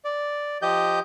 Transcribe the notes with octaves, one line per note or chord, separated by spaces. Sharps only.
D5
F3 G4 D#5 G6